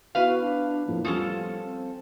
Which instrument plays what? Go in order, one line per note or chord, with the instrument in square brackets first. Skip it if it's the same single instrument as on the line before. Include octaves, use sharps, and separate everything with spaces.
[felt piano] B3 E4 [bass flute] F#4 [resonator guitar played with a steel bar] B4 F5
[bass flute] D4
[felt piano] F2 A2 A#3 [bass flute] F3
[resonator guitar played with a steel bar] F3 C#4 A4 [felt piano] G3 F4 [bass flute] B3
[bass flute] C4